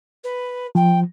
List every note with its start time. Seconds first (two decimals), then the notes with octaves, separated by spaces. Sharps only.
0.23 B4
0.75 F3 G5